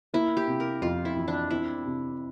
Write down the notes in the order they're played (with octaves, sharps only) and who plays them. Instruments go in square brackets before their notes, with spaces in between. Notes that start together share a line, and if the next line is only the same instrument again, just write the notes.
[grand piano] A#3 [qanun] E4
[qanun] G4
[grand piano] C3
[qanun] A#4
[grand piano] F2 [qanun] F4
[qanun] E4
[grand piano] E3
[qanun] D4
[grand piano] C4 [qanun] E4
[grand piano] C3